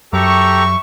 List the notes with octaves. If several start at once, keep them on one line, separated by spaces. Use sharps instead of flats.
F#2 G3 G4 A4 E5 A#5 C#6